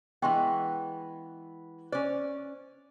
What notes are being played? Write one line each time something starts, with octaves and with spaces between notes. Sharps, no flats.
E3 G#3 B3 G5 C6 C#6
C#4 C5 D5